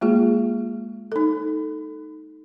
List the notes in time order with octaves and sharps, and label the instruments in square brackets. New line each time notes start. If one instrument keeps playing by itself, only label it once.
[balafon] G#3 A#3 F4 G#4
D#4 A4